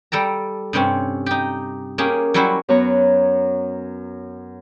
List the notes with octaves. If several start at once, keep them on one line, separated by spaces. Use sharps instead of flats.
G3 A4 G5 A#5
G2 C3 C4 C#4
D#4 G4
A#3 C#4 G4 G#4
F#3 G3 C#4 E4 F#4 C5
F#2 F#3 B3 C#5 A#5